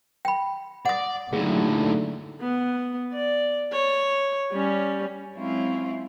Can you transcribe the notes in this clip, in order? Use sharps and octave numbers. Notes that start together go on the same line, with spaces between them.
G5 B5
D5 F#5 D#6
D#2 A2 D3 F#3 A3 G#4
B3
D5
C#5
G3 C#4
F#3 G#3 C4 C#4 E4 F4